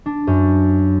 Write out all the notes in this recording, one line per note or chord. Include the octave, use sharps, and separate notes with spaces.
D4
F#2